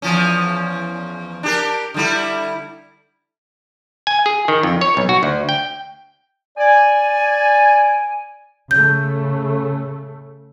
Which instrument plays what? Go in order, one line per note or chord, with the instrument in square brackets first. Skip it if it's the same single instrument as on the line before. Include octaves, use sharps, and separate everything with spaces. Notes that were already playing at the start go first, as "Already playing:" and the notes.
[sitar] E2 F3 C#4
D4 G4 A#4
D3 G3 E4
[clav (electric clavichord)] G#5
G#4
D#3
F2
C#5
B1
F#4
D2
G5
[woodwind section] D5 G#5
[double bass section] C#3 A3 [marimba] G6